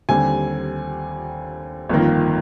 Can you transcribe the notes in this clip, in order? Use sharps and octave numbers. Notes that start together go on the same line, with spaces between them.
D#2 D3 G3 C4 G#5
G1 F2 D#3 A#3